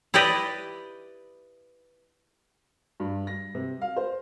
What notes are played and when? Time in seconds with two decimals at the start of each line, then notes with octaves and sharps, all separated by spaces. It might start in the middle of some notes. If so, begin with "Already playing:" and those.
0.14 E4 G4 B4 D5 D#5
3.00 G2
3.27 A#6
3.55 C3
3.81 F5
3.97 C5